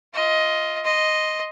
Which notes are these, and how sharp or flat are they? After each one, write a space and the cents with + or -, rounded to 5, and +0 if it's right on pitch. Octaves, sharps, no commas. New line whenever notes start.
F4 +0 D#5 +15
D#5 +0 C6 +0